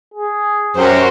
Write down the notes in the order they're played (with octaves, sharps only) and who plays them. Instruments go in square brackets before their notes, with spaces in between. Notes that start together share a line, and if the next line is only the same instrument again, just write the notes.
[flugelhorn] G#4
[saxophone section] F#2 [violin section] F#4 G4 C5